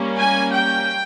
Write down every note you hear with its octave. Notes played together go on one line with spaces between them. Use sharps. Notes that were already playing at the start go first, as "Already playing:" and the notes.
Already playing: G3 A#3 C#4
G#5
G5